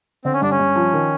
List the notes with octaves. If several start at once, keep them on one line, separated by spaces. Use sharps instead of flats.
D3 C4
C#4
G2 D4
C#4
G2
F3
D#3